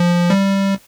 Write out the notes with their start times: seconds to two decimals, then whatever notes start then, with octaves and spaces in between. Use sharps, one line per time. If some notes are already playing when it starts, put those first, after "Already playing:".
Already playing: F3
0.30 G3